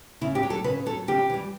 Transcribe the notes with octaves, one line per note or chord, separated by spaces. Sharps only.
C#3 E4
G4
F#3
A4
C#3 B4
F#3 A4
C#3 G4
E3 G3